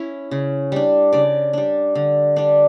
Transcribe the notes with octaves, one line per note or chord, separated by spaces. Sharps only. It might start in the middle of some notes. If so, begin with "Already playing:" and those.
Already playing: C#4 E4
C#3
G3 D4
C#3 D5
G3 D4
D3
G3 D4